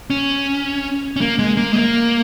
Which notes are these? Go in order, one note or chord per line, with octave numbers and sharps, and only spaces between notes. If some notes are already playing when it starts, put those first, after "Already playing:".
C#4
C#4
A#3
G#3
A#3
G#3
A#3